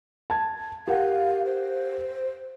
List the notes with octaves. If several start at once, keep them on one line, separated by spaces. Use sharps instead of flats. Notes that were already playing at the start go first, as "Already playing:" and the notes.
A5 G#6
G4 A#4 F5 F#5
C5